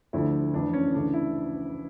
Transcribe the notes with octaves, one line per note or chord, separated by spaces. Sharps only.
D2 D3 F3 E4
F1 F2 E3 D4
C#4
D2 C#3 E3 D4
E4